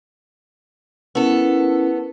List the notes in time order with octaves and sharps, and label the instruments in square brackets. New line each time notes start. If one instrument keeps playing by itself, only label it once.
[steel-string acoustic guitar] B3 A4 [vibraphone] C#4 E4 A#4